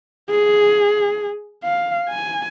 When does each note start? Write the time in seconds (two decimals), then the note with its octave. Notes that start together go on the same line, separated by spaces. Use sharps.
0.30 G#4
1.64 F5
2.09 G#5